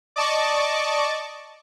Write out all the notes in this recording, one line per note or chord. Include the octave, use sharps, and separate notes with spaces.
D5 D#5 A5 C#6 D6